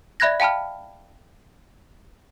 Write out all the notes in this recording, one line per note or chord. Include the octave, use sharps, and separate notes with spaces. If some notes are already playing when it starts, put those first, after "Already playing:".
D5 E5 B5 F#6 G#6 A#6
F5 G5 A5 B5 F6